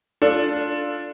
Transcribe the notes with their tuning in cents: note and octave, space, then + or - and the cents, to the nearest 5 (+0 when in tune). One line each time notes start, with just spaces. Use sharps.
D4 +0 F4 +0 A4 +0